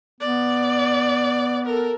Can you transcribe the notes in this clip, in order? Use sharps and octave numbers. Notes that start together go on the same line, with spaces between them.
B3 D5
A4 A#4